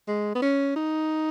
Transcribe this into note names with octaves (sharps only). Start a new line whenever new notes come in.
G#3
B3
C#4
D#4